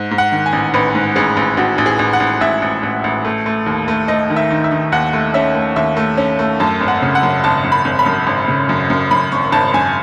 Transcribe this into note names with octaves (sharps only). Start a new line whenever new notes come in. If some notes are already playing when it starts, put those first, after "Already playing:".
Already playing: G#2
G#2
F#5
D#3
G#5
A1
A1 B4
G#2
A1 G#4
A1
A1 F#4
A1
G#4
A1
F#5
A1
A1 E5
A1
A1
A1
A3
A3
D#2
A3
A3 D#5
D#3
E5
D#3
E5
D#3
D#2 F#5
A3
C#4 E5
A3
D#2 E5
A3
C#4
A3
F#2 A5
G#1
F#5
C#3
F#5
F#2
G#1 A5
F#2
B5
G#1
B5
F#2
G#1
C#3
F#2
F#2
F#2 B5
G#1 C#6
G#1 A5
F#2 G#5